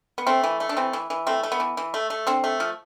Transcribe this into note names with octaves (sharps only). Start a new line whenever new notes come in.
B3
A3 C4
E3
A3
D4
E3 C4
E3
E3
A3 C4
A3
B3
E3
E3
A3
A3
D3 C4
A3
F3